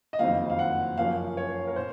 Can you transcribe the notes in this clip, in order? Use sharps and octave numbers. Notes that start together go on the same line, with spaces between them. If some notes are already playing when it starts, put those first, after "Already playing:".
D#5
F#1 F2 D#3 F#3 C4 F5
F5
F#5
F#2 F3 A#3 C#4 F5
C#5
A#4
A#2 C5